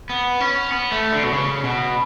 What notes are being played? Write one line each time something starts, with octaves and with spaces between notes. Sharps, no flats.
B3
C#4
B3
A3
D3
B2
C#3
B2